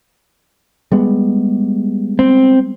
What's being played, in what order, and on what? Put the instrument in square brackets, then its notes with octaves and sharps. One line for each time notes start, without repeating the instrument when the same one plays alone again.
[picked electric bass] G3 G#3 B3
[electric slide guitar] C4